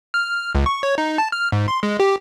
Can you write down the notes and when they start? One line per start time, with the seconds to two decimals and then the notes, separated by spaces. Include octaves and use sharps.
0.14 F6
0.55 C#2
0.66 C#6
0.83 C#5
0.98 D#4
1.18 A5
1.32 F6
1.52 G#2
1.68 C6
1.83 G#3
2.00 G4